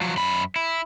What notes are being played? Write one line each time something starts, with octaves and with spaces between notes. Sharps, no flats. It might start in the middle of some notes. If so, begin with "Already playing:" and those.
F3 F#3
F#2 B5
E4